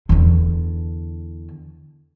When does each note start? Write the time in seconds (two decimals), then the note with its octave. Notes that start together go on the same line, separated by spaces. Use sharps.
0.09 E2 D3